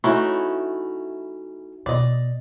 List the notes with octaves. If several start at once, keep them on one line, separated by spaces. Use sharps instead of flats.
E3 A3 C#4 D#4 E4 F#4
B2 D5 D#5